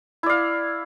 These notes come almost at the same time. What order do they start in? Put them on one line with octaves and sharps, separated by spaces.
E4 D5 F5